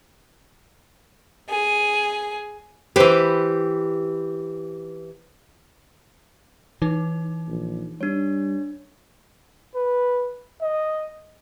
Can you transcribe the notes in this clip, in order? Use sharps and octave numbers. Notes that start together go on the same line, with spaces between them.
G#4
E3 G4 B4 C5
E3 D#4
A#1
G3 D4 C#5
B4
D#5